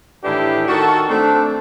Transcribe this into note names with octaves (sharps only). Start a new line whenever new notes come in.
A2 D#3 E3 D4 E4 G4
D#3 F#4 A4
A3 C4 D4